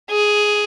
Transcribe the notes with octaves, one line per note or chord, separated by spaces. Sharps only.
G#4